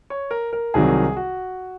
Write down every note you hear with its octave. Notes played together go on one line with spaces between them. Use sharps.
C#5
A#4
A#4
C2 C3 D#3 F#3 G#4
F#4